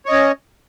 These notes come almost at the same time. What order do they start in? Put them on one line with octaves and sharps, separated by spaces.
C#5 D#5 C#4